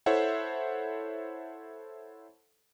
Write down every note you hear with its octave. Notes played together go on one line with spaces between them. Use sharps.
E4 A4 C5 C#5 E5 F#5